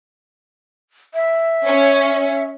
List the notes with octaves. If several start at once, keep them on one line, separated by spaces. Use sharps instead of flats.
E5
C#4